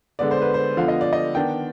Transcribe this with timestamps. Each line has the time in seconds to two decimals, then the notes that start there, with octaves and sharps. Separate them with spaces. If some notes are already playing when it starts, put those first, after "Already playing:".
0.19 D3 G#3 B3 D5
0.31 C5
0.42 B4
0.54 C5
0.77 D3 F3 B3 F5
0.88 D#5
1.01 D5
1.13 D#5
1.35 D#3 B3 D4 G5